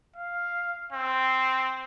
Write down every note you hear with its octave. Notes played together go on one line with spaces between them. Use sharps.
F5
C4